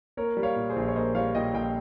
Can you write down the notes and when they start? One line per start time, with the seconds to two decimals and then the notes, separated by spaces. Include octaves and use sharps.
0.17 A#3 A#4 C#5
0.37 G3
0.43 C#5 F5
0.56 A#2
0.69 G#4 C5
0.76 A#1
0.88 C#5
0.96 A#3 C5 D#5
1.15 G3 C#5 F5
1.35 A#2 D#5 G5
1.54 A#1 D#5 G5